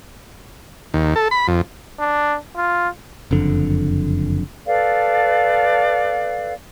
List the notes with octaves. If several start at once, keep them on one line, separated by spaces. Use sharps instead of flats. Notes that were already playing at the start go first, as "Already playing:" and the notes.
D#2
A4
B5
F2
D4
F4
F#1 F2 D3
A4 B4 D5 F5